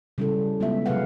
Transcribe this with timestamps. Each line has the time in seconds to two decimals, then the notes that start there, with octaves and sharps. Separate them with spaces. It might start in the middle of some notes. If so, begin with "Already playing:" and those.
0.18 C#3 G3 C#4 E4 A4
0.60 C#3 G#3 B3 E4 F4 E5
0.86 C3 F#3 G#4 B4 F5 F#5